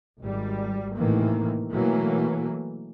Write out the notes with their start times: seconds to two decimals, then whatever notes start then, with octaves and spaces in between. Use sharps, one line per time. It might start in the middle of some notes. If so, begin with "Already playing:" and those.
0.19 G#1 G3
0.97 A2 C3 D#3 E3 A#3
1.72 B2 E3 F#3 A3 A#3